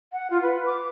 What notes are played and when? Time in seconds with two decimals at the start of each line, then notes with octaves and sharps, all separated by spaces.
0.12 F#5
0.30 F4
0.42 B4
0.66 D6